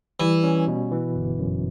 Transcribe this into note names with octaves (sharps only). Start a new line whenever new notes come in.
E3 G3
C#4
B2
E3
G1
F#2